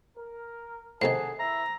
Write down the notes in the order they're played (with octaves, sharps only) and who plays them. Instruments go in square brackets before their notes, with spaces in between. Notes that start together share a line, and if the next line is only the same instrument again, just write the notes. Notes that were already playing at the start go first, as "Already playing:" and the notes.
[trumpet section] A#4
[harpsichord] A2 C3 D#3 [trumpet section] G#4 F#5 A5 [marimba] C5
[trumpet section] E4 E5 [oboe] A#5